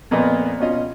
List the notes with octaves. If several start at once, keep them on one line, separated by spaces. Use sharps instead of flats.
F2 A#2 A#3 B3 B4 D#5
B2 C#4 F4 D#5